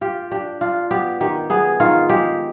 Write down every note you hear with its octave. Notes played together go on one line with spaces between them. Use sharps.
F4 G4
D4 G4
D4 F4
B3 G4
D#3 G4
B3 G#4
D#3 F4
G#3 G4